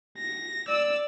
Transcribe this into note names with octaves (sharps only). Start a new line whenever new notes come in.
A#6
D5 E6